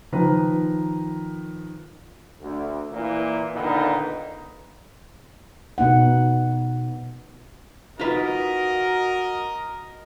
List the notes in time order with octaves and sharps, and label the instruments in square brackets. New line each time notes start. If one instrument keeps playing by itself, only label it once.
[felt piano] D#3 F3 B4 A#5
[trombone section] D2
A#2 E3 A#3
A#2 D3 D#3 B3 D#4
[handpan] B2 B3 D#4 F#5
[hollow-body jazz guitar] D#4 F4 B4 [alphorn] F#4 [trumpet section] A#4 D#5